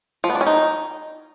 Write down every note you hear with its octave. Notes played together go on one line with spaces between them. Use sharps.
F3
B3
D4
C#4
D#4